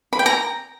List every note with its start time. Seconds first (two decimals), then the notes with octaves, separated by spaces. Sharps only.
0.13 B5
0.19 G5
0.26 A#5